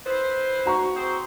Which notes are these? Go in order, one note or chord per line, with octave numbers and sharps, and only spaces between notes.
E4 B4 C5
F#4 A#5 C#6
C4 G#4 C5